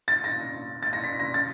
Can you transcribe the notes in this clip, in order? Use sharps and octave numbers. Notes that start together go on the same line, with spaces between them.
A6
A#6
A6
A#6
B6
A#6
A6